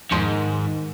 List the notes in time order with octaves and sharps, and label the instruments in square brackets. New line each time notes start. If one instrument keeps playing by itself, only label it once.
[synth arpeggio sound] E2 F3 C6 [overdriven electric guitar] G#2 [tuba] D#3